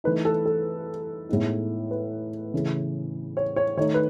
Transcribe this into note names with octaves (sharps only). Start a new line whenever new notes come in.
E3 A3 D#4 B4
A4
A4
A2 G#3 B3 D#4
B4
C#3 E3 A3
C#5
C#5
D#3 A3 D#4 C#5
B4